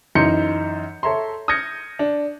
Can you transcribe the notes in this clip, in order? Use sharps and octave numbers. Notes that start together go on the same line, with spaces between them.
F#2 E3 D#4 C6 G6 C#7
A4 C#5 E5 A#5 C6
D#6 F6 G6 G#6 A#6 C#7
D4